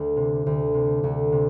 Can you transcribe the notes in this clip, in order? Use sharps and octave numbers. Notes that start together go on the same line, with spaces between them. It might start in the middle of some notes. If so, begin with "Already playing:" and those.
Already playing: D2
C3
D2
C3
D2
C3